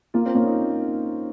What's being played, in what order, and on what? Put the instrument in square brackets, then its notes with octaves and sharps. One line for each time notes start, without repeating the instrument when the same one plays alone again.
[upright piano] A#3 [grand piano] F4
[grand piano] C4
[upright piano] A#3 [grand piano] C#4
[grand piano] D#4